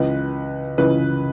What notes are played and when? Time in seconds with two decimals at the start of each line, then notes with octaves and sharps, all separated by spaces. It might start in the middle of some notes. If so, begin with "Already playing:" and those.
Already playing: C#2 C#3 E3 B4
0.78 C#2 C#3 E3 B4